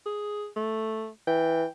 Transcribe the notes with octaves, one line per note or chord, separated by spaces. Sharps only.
G#4
A3
E3 G5